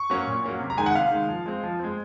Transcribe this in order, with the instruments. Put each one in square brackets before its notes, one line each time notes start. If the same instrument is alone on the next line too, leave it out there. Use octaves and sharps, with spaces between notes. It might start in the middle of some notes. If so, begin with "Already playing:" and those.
Already playing: [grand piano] C#6
F#3 A#3 C#4
A#2
F#3 A#3 C#4
C3
A#5
D#3 G#3 G#5
F#5
C3 F5
D#3 G#3
F3
G#3 C4
F3
G#3 C4